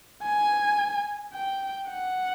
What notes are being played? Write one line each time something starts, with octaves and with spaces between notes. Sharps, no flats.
G#5
G5
F#5